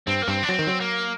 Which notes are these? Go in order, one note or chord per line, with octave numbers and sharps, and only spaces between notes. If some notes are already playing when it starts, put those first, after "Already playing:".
G2 C4
A#3
G2 C4
D4
F#3 C4
D#3
F#3
A#3